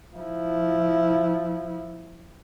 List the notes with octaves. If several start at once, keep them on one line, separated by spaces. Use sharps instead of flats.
F3 E4